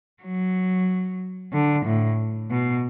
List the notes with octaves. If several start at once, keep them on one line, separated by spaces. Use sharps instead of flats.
F#3
D3
A2
B2